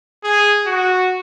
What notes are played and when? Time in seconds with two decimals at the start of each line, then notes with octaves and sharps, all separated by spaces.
0.23 G#4
0.66 F#4